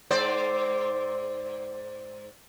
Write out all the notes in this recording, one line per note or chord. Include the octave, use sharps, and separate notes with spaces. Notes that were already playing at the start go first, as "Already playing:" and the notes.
G#2 C5 D5